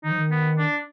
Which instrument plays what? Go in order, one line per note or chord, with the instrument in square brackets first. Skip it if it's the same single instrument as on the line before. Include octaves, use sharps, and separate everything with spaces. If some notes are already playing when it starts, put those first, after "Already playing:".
[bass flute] D#3 [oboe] D#4
[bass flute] F3
D#3
[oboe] B3
D4